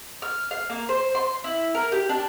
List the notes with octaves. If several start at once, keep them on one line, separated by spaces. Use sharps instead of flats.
F6
F5
A#3
C5
C6
E4
A#4
G4
D4